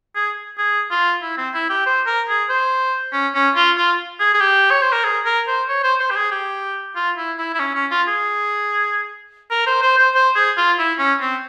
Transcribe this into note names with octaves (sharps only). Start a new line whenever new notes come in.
G#4
G#4
F4
E4
C4
E4
G4
C5
A#4
G#4
C5
C#4
C#4
F4
F4
G#4
G#4
G4
C#5
C5
A#4
G#4
A#4
C5
C#5
C5
C5
G4
G#4
G4
F4
E4
E4
E4
C#4
C#4
F4
G#4
A#4
C5
C5
C5
C5
G#4
F4
E4
C#4
C4